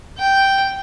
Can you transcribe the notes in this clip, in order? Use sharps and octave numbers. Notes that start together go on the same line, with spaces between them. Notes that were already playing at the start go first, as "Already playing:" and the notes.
G5